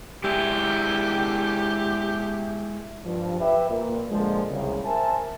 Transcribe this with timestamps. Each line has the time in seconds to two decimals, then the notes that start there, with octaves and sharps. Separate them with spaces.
0.24 G#3 E4 G4 D5
3.06 G2 F3
3.40 G4 B4 E5
3.70 A#2
4.11 A#2 D3 F3 G#3
4.50 C2 C#3
4.85 A#4 C5 E5 G#5 A5